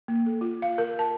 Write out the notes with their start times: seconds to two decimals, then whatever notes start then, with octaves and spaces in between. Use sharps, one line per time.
0.08 A#3
0.26 A4
0.41 F4
0.62 F5
0.78 A#4
0.99 A5